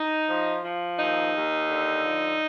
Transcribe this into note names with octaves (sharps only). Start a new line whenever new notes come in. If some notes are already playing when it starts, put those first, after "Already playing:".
Already playing: D#4
F3
F3
D#2 D#4
D#2
D3
F3